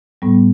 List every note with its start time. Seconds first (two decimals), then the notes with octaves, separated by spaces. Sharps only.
0.22 A2 G3 B3